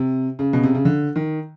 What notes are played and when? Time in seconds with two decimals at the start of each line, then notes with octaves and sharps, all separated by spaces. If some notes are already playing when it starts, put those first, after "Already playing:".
Already playing: C3
0.39 C#3
0.53 B2
0.64 C3
0.75 C#3
0.85 D3
1.16 D#3